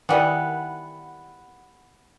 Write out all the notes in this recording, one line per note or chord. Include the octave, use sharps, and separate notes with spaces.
D#3 E3 G3 B3 F#5